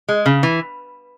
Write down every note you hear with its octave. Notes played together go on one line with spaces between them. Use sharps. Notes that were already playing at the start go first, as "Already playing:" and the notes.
G#3
C#3
E3